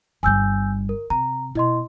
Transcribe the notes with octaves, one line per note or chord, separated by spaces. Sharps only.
G1 G3 G#5 E6 G6
A#4
C3 A#5
B2 E4 D#5 C6